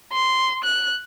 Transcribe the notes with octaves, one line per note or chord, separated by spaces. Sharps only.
C6
F#6